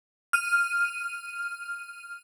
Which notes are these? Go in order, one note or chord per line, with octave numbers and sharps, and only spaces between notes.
F6 D#7